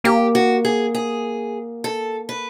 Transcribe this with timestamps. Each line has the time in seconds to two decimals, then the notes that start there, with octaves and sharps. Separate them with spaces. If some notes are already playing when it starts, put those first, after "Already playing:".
0.04 A#3 G4
0.35 F#4
0.65 G#4
0.95 G#4
1.84 A4
2.29 B4